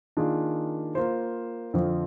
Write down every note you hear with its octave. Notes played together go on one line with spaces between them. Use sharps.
D#3 A#3 D4 F4 G#4
A#3 F4 C5
F2 D3 F3 C4 F4